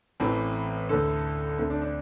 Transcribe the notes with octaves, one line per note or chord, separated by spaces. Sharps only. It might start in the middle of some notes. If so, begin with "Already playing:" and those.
A1 A2 E3 C4
D2 D3 A4
D2 D3 C4
D4
D4